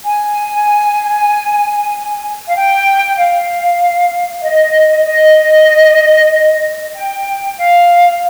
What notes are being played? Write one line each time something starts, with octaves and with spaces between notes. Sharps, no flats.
G#5
F5
G5
F5
F5
D#5
D#5
G5
F5